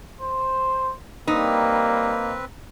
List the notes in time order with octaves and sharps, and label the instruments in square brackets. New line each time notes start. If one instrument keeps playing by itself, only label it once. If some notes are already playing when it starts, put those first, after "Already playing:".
[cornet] C5
[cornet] G3 [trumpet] A#3 [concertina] C4 B4 [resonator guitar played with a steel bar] D#4